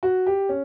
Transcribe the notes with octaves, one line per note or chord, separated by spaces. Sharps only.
F#4
G4
C#4